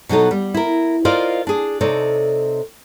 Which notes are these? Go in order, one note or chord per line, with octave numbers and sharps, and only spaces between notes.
B2 F#3 D#4 A4
G3
E4 A#4
F4 A#4 C5 D5 D#5 F5
D4 G#4
C3 D#4 A4 C#5 D5